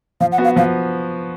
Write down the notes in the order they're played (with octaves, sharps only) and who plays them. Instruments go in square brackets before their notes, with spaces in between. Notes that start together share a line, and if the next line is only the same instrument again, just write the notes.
[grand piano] F3 [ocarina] F5
[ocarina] F#5
[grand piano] B3 F#4
[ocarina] F5
[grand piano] F3 [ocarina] F5